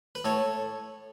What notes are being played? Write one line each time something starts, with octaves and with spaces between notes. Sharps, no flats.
B4
A2 A4 C#5